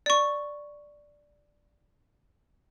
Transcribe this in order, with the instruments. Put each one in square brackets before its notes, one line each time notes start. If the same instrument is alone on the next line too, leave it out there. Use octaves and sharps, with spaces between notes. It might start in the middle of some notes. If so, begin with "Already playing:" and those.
[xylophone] D5 C#6